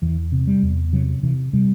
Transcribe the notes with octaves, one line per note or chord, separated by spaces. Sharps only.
E2 E3
C3
G3
E2
C3 F#3
C3 E3
C3 G3